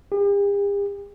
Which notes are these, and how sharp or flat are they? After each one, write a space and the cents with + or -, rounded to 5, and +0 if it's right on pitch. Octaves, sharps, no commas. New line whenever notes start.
G4 +45